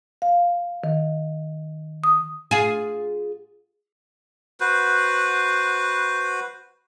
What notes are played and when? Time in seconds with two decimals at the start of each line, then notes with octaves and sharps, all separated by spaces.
0.22 F5
0.84 D#3
2.04 D#6
2.51 F4 G#4
4.60 F#4 B4 C5